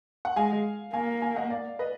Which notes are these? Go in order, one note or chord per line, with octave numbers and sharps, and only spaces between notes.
F#5
G#3 F5 G#5
A#3 F5 G#5
F5 G#5
D#5 F#5
D5 F5
B4 D#5